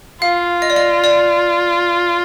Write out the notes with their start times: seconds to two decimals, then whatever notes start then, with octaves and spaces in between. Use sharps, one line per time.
0.22 F4 F5
0.62 D#5
0.70 D5
0.76 D#5
1.04 D5